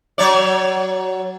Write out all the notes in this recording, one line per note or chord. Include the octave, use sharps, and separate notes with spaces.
F#3 C#5 D5